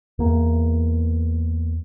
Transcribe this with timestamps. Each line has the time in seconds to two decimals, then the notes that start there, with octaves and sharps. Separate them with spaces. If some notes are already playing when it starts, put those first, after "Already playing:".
0.19 E2 A#3